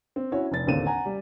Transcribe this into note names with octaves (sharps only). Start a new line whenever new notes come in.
C4
C#4 E4 F#4 C#5
F1 A6
A1 D#2 D3 C4 D#7 E7
F#5 G#5 A#5
G3